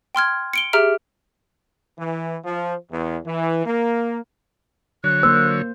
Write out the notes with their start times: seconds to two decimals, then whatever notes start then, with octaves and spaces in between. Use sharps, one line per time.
0.15 G5 C6 F6 G#6
0.53 C#7 D7 G7
0.73 G4 G#4 E5 A#5 F6 D7
1.99 E3
2.45 F3
2.92 E2
3.25 E3
3.66 A#3
5.04 D3 F#3 C#5 F#6
5.23 A#3 C5 E6